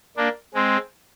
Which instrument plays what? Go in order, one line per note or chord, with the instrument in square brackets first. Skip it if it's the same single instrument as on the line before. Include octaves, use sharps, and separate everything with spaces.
[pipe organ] A#3 D4
G#3 C4